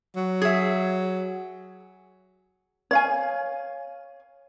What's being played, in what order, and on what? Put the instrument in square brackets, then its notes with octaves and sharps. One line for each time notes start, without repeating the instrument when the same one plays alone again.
[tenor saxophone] F#3
[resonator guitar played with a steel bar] G#4 E5
[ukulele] C#5 F5 G#5